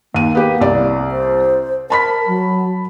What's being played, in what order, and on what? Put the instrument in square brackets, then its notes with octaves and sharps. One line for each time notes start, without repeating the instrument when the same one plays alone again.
[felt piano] D#2 D#7 [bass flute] A#3
[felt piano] B3 G4
C2 D5
[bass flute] C5
[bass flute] A#4 [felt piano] A5 B5 B6
[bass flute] F#3